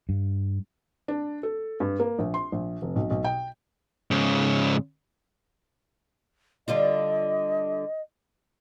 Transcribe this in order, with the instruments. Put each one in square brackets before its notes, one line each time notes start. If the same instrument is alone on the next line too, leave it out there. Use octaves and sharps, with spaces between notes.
[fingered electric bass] G2
[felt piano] D4
A4
G2
A#3
A#1
C6
A#1
F1
B1
B1
G5
[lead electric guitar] G#2 C#3
[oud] D3 G3 F4 [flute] D#5